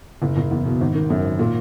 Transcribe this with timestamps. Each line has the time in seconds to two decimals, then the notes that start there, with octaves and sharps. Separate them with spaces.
0.22 F#1
0.37 F#1
0.51 E2
0.65 B2
0.81 G#1
0.95 D#3
1.10 F#2
1.24 G#1
1.39 A#2